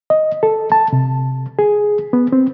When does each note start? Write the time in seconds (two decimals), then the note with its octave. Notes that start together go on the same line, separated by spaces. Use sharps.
0.10 D#5
0.43 A4
0.72 A5
0.93 C3
1.59 G#4
2.13 B3
2.33 C4